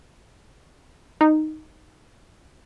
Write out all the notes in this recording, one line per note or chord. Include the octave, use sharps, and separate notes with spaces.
D#4